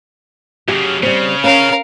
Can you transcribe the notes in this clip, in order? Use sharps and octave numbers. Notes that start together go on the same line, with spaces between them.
F#2 C#3 G4
C#3 G3 C4
C#4 A#4 F5